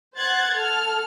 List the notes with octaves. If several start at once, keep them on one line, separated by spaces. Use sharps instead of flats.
C5 F#5 F#6 G#6 A6
A4 F6